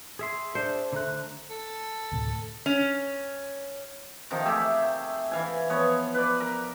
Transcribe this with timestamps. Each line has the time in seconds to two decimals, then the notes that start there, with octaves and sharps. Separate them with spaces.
0.19 G#4 E5 C6
0.55 D4 C5
0.93 D3 A3 A#5 F#6
1.50 A4
2.12 D2 A2 C3
2.66 C#4
4.31 C3 D#3 F3
4.45 A3 G4 G#4 E5
5.31 E3 F5 G#5
5.69 F3 B3 C#5
6.14 B4 D5
6.40 A#4